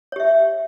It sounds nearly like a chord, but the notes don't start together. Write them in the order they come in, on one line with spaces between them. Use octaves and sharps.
C#5 G4 E5